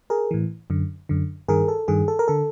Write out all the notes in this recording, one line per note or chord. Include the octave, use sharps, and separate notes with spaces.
G#4 A#4
A2 E3
F#2 D3
F#2 D3
G2 D#3 G#4 A#4
A4
G2 D#3 G#4
A4
A#4
D3 A4